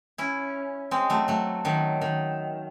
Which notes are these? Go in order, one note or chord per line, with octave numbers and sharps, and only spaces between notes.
C#4 E4
G#3 C4
F#3 A3
F#3 A3
D#3 F#3
D#3